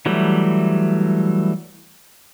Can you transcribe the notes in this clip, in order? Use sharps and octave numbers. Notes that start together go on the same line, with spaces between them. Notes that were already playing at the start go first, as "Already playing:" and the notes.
E3 F#3 G3 A3